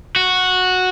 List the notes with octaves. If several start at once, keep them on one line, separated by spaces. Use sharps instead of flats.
F#4